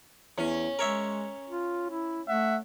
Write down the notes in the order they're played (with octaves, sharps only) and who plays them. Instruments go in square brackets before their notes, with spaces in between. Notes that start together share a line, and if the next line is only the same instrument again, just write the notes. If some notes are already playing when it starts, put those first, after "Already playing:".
[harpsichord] E2 [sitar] C#4
[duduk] G#3 [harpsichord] A#4 C#5 E5
[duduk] F4
E4
[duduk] A3 [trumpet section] E5 F#5